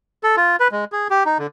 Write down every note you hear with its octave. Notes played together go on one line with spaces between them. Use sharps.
A4
F4
B4
G#3
G#4
G4
D#4
D3